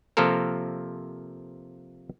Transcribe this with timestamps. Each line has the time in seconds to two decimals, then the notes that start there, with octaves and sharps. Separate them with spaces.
0.17 C3 F3 A#3 F4 A4 A#4